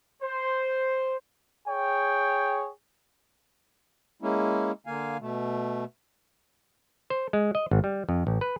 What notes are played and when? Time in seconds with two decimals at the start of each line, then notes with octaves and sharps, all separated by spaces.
0.22 C5
1.68 G#4 C#5 G5
4.22 G#3 A#3 C#4 E4
4.86 D3 A#3 F5 G#5
5.20 B2 A3
7.10 C5
7.33 G#3
7.55 D#5
7.71 G#1
7.84 G3
8.09 F2
8.27 A1
8.41 B4